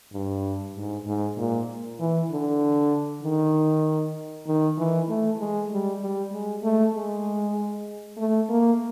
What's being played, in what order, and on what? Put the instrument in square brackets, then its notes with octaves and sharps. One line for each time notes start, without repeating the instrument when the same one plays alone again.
[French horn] G2
G#2
G#2
A#2
E3
D3
D#3
D#3
E3
A3
G#3
G3
G3
G#3
A3
G#3
A3
A#3